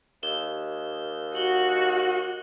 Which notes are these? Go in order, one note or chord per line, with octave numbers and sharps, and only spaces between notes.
D#2 E7 G7
F#4 F#7 G7